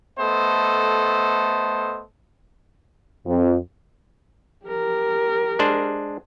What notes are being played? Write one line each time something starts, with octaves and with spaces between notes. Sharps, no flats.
A3 B3 A4 C5 D#5
F2
G4 A#4
G#3 D4 C5